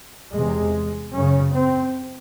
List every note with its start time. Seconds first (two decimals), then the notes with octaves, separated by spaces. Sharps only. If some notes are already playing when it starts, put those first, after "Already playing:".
0.34 E2 C3 G#3
1.13 F#2 C#3 C#4
1.53 C4